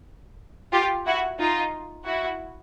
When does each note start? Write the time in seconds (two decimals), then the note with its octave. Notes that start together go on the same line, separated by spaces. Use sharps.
0.73 F4 G4
1.06 E4 F#4
1.39 D#4 F4
2.05 E4 F#4